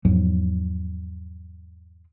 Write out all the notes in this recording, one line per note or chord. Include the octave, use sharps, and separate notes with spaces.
E2 G#2 F3 F#3